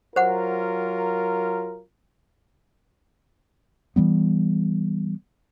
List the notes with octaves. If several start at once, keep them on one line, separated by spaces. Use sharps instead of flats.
F#3 F4 A#4 C5 F#5
E3 F3 G3 B3